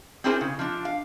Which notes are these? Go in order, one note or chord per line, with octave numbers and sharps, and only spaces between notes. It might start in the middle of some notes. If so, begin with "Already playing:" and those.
C4 D4 E4 G#4 A#4 C5
C#3
F3 D4
F5